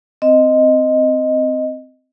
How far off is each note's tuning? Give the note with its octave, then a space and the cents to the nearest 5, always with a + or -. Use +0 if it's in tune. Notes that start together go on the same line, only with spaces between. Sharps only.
C4 -10 D#5 +0